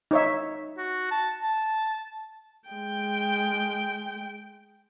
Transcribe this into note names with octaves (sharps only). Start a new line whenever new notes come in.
D#4 C#5 E5
F#4
A5
A5
G#3 G5